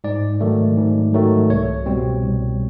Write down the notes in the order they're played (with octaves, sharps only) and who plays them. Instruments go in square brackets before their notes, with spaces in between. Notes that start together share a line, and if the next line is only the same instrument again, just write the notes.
[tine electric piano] G#2 D5
D#3 F#3 A3
G#2
D#3 F#3 A3
C2 C#5
B2 G3 C4
C2